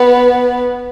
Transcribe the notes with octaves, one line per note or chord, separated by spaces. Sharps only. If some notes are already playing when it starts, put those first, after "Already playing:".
Already playing: B3